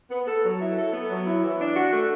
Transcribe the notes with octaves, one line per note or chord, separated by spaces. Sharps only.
B3
A4
F#3
E4
A4
B3
F#3
E4
E3
D4
F#4
A3